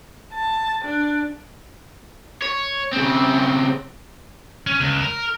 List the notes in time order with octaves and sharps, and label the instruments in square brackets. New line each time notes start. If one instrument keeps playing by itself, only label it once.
[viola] A5
D4
[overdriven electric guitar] C#5
C#3 C4
[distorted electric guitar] C#4
C#2
A#4